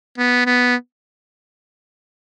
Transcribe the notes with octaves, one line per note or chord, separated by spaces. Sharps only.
B3
B3